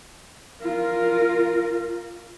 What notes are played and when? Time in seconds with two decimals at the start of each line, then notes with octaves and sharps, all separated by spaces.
0.61 F4 A#4